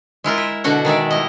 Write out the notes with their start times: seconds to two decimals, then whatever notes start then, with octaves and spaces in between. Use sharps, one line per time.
0.24 G#3 E4 F4 A#4
0.38 E5
0.64 B2 D3 D4 F#4 F#5
0.85 D#3 G#3 D5 E5
1.11 G3 E4 D#5